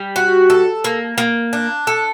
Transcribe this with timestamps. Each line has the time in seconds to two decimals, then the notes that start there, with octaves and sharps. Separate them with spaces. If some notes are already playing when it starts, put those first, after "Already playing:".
Already playing: G3
0.16 F#4
0.50 A4
0.84 A#3
1.18 A#3
1.53 D4
1.87 A4